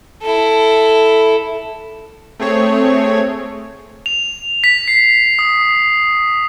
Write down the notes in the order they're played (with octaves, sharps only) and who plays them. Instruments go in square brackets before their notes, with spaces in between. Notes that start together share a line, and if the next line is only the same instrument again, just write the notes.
[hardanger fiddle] E4 A4
[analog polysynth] A3 C4 G#4 C#5
[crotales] F7
B6
C7
D#6